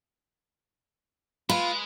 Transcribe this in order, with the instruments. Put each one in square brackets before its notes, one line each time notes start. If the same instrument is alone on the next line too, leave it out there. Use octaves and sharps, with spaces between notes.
[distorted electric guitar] G#3 [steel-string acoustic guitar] F4 [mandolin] B4